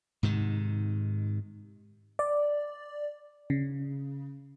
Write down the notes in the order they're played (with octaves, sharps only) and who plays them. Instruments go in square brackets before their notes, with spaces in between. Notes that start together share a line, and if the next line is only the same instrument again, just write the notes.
[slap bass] G#2 C3 D#3
[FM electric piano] D5
C#3